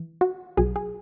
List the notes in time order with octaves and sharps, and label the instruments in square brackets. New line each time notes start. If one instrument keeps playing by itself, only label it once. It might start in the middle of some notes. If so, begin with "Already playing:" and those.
Already playing: [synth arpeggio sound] E3
F#4
B1 B2 F#3 G#4
G#4